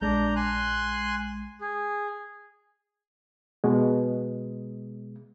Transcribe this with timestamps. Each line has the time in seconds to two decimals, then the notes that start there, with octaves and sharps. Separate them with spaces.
0.01 A#1 G#3 D4 A#5 G6
0.36 G#5 C6 F#6
1.61 G#4
3.64 B2 G#3